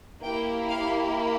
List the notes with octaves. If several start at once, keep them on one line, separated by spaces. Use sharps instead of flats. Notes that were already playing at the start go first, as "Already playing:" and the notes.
A#3 E4 G4 G5
F5